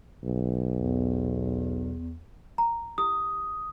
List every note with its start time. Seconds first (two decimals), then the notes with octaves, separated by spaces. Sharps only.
0.24 B1
0.74 E2
2.58 A#5
2.98 E4 G4 D#6